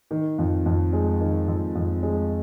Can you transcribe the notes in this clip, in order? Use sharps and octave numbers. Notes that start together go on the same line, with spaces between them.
D#3
F2
F2
G#3
D#3
F2
F2
G#3